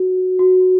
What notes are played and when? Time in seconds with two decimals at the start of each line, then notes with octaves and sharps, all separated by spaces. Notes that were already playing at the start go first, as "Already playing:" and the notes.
Already playing: F#4
0.39 F#4